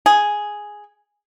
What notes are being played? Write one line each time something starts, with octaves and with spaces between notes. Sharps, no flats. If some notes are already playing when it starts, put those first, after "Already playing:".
G#4